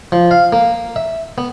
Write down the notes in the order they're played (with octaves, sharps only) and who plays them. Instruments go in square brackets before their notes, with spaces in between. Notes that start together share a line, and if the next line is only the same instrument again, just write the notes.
[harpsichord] F3
F5
A#3
E5
B3